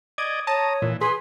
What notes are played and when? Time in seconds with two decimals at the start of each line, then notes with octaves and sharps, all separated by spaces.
0.18 D5 D#5 G#6
0.47 C#5 A5 A#5 D#6
0.82 A#2 E3
1.01 G#4 B4 C6